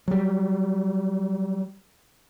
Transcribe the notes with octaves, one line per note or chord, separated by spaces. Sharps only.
F#3 G3